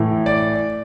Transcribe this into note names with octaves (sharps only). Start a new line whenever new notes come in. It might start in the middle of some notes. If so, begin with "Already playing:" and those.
Already playing: A2 E3
D5